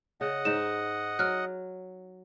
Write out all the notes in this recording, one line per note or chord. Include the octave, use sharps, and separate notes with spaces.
C#3 D#5 F#5
G#2 D#4 E7
F#3 F6 F#6